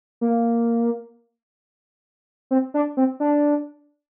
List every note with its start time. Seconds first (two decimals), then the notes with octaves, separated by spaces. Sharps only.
0.21 A#3
2.51 C4
2.74 D4
2.97 C4
3.20 D4